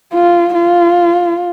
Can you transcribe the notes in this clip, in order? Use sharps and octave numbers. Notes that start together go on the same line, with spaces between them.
F4
F4